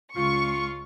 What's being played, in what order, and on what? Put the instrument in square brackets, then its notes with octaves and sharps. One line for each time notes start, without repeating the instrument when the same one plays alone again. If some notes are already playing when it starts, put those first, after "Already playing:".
[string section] C#2 C#6 [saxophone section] F4